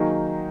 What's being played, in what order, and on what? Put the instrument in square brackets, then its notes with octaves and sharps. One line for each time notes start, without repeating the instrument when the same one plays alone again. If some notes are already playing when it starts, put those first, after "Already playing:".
Already playing: [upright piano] D#3 F#3 A#3 D#4 G#4